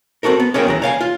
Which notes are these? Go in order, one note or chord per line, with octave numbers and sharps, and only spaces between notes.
C4 C#4 F#4 A4 A#4
B3
C#4 F#4 G#4 A#4 C#5 G5
D#2 E3 A#5
C#5 F5 G5 G#5
F4